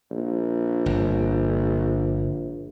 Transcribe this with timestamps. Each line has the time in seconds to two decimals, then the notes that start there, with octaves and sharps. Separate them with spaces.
0.11 A#1
0.86 G1